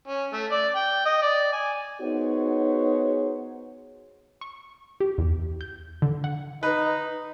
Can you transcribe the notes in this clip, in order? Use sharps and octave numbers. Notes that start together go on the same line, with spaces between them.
C#4
A3
D5
G5
D#5
D5
G#5
B3 D#4 F#4 G#4 C5 C#5
C#6
G4
E2
G6
D3
F#5
D#4 B4